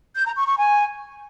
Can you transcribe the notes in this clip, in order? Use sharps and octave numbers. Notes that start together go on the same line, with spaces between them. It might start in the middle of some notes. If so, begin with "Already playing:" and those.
G6
A#5
C#6
C#6
G#5